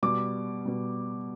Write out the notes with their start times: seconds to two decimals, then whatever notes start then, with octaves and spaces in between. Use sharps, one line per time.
0.03 B2 G3 D6
0.65 B2 G3